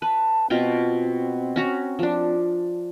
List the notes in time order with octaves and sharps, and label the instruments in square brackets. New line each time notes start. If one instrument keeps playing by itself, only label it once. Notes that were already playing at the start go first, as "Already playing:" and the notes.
[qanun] B4 [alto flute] A5
[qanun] B2 F4 G5 [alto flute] C4
[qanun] C#4 F#4 A#5
F3 D4